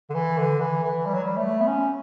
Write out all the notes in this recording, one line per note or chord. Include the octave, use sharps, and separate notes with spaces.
D3
E3
D3
E3
E3
G3
F#3
G3
A3
B3
C#4